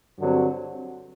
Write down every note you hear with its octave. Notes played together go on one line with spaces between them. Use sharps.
G2 D3 F#3 C4